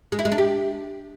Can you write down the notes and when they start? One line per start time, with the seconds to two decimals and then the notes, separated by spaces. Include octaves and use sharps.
0.12 G#3
0.19 E4
0.25 G#3
0.32 D4
0.38 G4